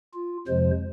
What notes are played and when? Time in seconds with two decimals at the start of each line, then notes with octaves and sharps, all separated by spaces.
0.14 F4
0.47 F2 C3 F3 G#3 C5